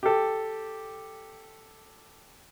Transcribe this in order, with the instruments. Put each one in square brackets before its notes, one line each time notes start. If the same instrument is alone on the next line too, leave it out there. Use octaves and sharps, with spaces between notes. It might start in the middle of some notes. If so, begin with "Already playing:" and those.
[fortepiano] G4 A4